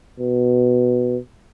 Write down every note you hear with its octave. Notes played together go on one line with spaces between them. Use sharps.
B2